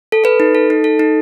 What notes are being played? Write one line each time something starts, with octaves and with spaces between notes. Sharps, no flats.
A4
A4 B4
D#4
A4
D#4
A4
D#4